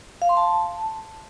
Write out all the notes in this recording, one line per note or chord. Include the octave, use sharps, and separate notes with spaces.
F5
C6
A5